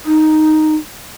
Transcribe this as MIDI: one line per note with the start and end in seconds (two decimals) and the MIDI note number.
0.06 0.75 63